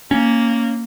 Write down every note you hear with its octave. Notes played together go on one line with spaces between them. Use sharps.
A#3 C#4